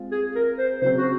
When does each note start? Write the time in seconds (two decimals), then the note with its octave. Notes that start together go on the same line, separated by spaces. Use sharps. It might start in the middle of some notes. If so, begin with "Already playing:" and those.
Already playing: G#3 C4 F4
0.11 G#4
0.35 A#4
0.58 C5
0.82 C#3 F#3 C4 C5
0.98 F#4